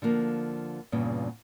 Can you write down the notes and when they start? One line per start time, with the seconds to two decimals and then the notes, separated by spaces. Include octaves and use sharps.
0.02 D3 F3 A#3
0.92 E2 G2 A#2 C#3